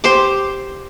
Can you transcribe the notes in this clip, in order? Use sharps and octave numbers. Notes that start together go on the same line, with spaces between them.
G4 C5 C6 D6